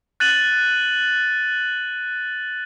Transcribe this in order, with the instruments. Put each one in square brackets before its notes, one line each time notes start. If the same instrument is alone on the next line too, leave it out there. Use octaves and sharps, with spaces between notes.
[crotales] F#6 A6 D#7 F#7